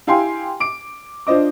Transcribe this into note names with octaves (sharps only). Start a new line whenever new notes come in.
E4 G4 F5 G5 G#5 C6
D6 D7
D4 F4 C5 D#5 D6